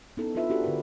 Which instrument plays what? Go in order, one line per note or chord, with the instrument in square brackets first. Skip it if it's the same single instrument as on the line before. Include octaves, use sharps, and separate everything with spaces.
[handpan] B3 C#4 D#4 E4 A4
D4 E4 F4 B4 E5
D4 E4 F#4 G4 A4
D3 A#4 B4